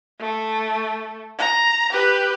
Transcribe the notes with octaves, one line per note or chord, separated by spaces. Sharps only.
A3
A#5
G4 B4